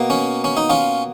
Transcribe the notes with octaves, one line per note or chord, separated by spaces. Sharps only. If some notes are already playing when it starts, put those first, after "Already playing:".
Already playing: B2 A#3
C#4
C#4
D#4
C#4 F4